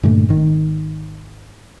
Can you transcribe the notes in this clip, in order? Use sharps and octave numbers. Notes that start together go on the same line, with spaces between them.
G2 A#2 D3 A3
G#1 D#3